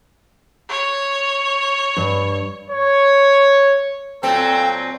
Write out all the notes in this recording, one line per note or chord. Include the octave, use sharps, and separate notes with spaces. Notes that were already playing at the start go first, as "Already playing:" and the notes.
C#5
G2
C#5
A#2 F#3 C4 A4 G5